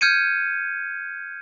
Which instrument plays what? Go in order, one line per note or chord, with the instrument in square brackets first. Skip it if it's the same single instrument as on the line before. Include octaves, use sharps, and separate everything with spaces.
[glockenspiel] F6 G6 G#6 C#7 D#7